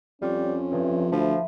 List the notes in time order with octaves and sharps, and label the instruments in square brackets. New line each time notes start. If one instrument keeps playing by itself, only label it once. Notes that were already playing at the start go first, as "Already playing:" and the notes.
[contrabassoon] F2 [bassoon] G3 [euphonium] C#4 [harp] F4 C#5
[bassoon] G2 [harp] F3 E4
[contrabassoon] D2 [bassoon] F3 [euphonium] F4 [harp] A4 B4 E5